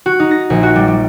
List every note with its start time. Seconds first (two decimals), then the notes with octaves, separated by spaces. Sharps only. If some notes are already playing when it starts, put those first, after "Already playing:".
0.06 F#4
0.20 D#4
0.31 A#6
0.50 A#1
0.63 F#4
0.76 G3
0.88 G3